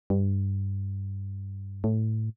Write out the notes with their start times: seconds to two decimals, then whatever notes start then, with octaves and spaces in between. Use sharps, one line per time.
0.10 G2
1.84 A2